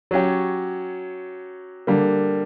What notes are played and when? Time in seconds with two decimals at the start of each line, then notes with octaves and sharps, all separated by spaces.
0.11 F#3 C#4 G4
1.87 D3 G3 A#3